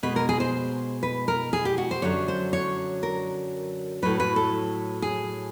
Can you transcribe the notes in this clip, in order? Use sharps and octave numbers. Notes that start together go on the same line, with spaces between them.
B2 G#3 B4
A#4
G#4
C5
B4
A#4
G#4
G4
F#4
C5
F#2 D3 F#3 C#5
C5
C#5
A#4
A2 F#3 B4
B4
A4
G#4